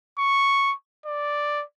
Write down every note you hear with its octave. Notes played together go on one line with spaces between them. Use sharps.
C#6
D5